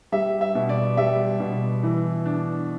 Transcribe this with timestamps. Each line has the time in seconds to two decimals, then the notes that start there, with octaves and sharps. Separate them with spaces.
0.12 G3 E5
0.41 E5
0.55 B2
0.69 D5
0.97 G3 E5
1.40 B2
1.83 E3
2.25 D4